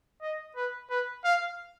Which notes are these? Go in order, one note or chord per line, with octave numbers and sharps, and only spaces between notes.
D#5
B4
B4
F5